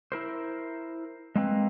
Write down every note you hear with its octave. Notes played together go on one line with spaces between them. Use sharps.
E4 A#4 C5
G#3 A#3 C4 B4